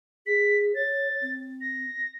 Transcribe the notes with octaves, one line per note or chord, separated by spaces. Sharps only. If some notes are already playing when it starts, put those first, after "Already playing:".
G#4 B6
C#5 A6
C4
A#6